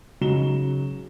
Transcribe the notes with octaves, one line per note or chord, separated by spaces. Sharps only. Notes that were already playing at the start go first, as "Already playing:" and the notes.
C#3 F#3 D#4 A#5 E7 G7